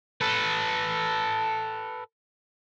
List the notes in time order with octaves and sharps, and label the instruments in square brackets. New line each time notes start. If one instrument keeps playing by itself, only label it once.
[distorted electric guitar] A4 B4